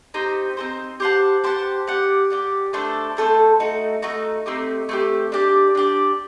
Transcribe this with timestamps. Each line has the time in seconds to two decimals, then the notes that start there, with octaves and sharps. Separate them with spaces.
0.14 C4 D#4 G4 C5
0.57 C4 D#4 G4 C5
1.00 G4 C5 F#5 A5
1.44 G4 C5 F#5 A5
1.87 G4 D5 F#5
2.30 G4 D5 F#5
2.73 A3 D4 A4 C5
3.17 A3 D4 A4 C5
3.60 A3 D#4 F#4
4.02 A3 D#4 F#4
4.46 A3 C4 D#4 G4
4.89 A3 C4 D#4 G4
5.32 D4 G4 D5
5.75 D4 G4 D5